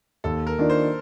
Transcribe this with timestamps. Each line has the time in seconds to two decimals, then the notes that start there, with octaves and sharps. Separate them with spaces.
0.24 D#2 A4
0.47 A#4
0.59 D#3 A#3 D4 F4
0.70 C5